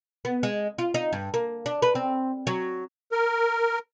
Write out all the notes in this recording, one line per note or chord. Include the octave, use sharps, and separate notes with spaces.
B3
G#3
F4
D#4
G2
A#3
D4
B4
C4
F#3
A#4